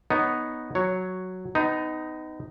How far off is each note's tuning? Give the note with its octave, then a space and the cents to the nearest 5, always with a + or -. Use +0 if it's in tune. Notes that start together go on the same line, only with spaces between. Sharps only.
B3 +0 D#4 +0 C#5 +0
F#3 +0 C#5 +0
B3 +35 D#4 +0